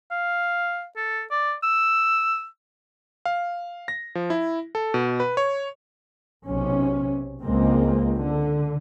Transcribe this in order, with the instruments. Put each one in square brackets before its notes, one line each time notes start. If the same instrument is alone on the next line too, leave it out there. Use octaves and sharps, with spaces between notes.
[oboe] F5
A4
D5
E6
[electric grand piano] F5
A#6
F3
E4
A4
B2
B4
C#5
[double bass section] B1 C3 C#4
C#2 G#3 A#3 C4
D3